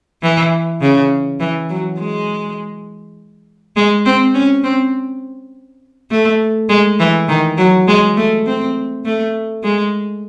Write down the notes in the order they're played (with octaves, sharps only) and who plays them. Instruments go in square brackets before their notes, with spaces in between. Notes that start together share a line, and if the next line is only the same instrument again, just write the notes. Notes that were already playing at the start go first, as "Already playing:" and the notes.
[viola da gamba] E3
C#3
E3
F#3
G#3
G#3
C4
C#4
C4
A3
G#3
E3
D#3
F#3
G#3
A3
C4
A3
G#3